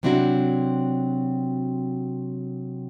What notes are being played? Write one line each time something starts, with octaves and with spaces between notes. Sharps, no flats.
C3 F#3 C4 D4 E4 F#4